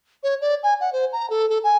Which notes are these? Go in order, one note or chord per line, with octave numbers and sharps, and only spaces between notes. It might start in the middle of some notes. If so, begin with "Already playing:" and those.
C#5
D5
G#5
F#5
C5
A#5
A4
A4
G#5